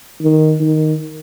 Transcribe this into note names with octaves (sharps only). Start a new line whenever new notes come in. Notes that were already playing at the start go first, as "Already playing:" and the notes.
D#3
D#3